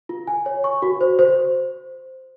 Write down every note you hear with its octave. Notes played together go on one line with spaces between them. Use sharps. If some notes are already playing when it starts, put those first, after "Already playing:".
F4
G#5
C#5
C#6
F#4
C5
C5